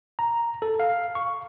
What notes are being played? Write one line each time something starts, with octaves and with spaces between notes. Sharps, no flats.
A#5
A4
F5
C#6